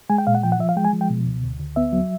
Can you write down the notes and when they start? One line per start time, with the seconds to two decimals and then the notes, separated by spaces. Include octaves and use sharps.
0.10 G#3 G#5
0.18 G5
0.27 A#2 F5
0.35 F#5
0.43 F3 G5
0.52 F#5
0.59 F3 E5
0.69 F5
0.77 G#3 G5
0.85 G#5
0.93 F3
1.01 G5
1.10 B2
1.27 C#2
1.43 D2
1.60 D2
1.76 B3 E5
1.93 F#3